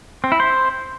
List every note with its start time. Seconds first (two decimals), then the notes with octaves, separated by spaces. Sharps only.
0.24 C4
0.32 E4
0.40 C5